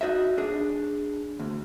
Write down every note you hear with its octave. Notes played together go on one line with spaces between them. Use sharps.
D#4 F#4 D#5 E5
D4 G#4
D2